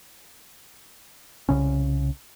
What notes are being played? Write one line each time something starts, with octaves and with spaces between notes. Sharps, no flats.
C2 C#3 C#4